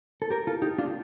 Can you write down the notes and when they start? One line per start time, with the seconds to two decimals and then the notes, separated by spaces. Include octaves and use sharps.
0.22 A4
0.30 G4 A#4
0.47 F4 A4
0.62 D#4 G4
0.78 D4 F4